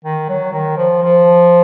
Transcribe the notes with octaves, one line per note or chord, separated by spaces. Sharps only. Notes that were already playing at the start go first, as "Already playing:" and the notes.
D#3
F#3
D#3
F3
F3